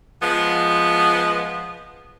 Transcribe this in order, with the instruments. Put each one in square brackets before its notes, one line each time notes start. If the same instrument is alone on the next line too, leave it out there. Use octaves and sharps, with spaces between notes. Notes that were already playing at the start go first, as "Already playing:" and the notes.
[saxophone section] F3 G#3 B3